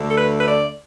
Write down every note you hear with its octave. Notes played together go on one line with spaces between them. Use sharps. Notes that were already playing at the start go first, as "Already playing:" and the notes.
Already playing: D2 D3 A3
A4
B4
B4
D5